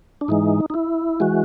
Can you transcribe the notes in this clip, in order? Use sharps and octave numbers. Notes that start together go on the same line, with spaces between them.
D4
G#2 E3 G#3 D#4
D#4
E4
E3 G#3 F#4